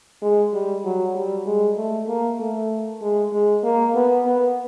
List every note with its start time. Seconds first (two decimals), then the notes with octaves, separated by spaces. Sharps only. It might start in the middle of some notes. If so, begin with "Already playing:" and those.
0.22 G#3
0.54 G3
0.85 F#3
1.15 G3
1.46 G#3
1.77 A3
2.08 A#3
2.40 A3
3.02 G#3
3.33 G#3
3.64 A#3
3.94 B3
4.25 B3